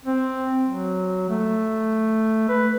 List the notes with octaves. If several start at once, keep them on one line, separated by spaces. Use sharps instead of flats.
C4
F#3
A3
B4